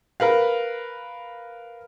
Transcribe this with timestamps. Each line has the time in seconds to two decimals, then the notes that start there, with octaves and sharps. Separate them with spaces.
0.20 A#4 B4 F5